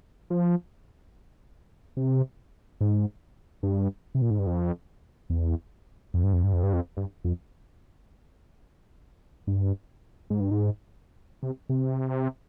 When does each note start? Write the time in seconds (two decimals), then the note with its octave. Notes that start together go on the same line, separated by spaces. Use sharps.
0.30 F3
1.97 C3
2.81 G#2
3.63 G2
4.15 C3
4.22 A#2
4.30 G#2
4.39 G2
4.47 F2
5.30 E2
6.14 F2
6.23 G2
6.33 F2
6.44 G2
6.53 F2
6.63 G2
6.73 F2
6.97 G2
7.24 F2
9.47 G2
10.30 G#2
10.40 G2
10.51 G#2
11.43 C3
11.69 C3